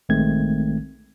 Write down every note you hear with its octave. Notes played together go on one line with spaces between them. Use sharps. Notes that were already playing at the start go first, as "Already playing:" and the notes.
A#1 D#3 G#3 A3 C4 G#6